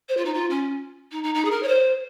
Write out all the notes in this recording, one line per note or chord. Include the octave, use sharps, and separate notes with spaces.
C5
F4
D#4
F4
C#4
D#4
D#4
D#4
G#4
A#4
C#5
C5